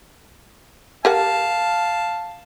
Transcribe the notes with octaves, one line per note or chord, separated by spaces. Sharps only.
G4 A#4 F5 F#5 A5